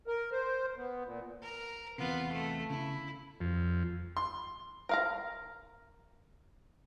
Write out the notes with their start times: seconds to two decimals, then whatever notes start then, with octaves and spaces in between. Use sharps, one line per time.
0.07 A#4
0.32 C5
0.77 B3
1.05 A#2
1.42 A#4 A#5
1.98 E2 C3 B3 F4
2.32 A3
2.70 C#3 E4
3.41 F2
4.17 C6
4.89 A#4 F5 A#5